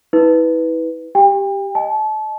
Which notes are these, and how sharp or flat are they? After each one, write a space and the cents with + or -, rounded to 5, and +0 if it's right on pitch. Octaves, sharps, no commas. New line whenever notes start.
E4 -35 B4 +0
G4 +0 G5 +35
D#5 +0 A5 -30